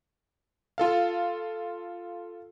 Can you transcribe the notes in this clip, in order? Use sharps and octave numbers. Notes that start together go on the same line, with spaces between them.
F4 A4 F5